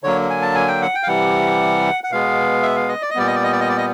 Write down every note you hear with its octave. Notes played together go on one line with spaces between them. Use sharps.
D3 F#3 A#3 C#5
G#5
A5
G#5
G5
F#5
G5
F5
C3 E3 G3 F#5
F#5
B2 G#3 B3 F5
E5
F5
D#5
D5
D#5
A#2 G3 B3 D5
D#5
D5
D#5
D5
D#5
D5
D#5